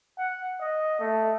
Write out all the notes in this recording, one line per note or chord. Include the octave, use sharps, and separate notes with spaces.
F#5
D#5
A3